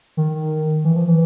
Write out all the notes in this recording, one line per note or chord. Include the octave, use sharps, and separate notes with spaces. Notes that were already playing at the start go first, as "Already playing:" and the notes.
D#3
E3
F3
E3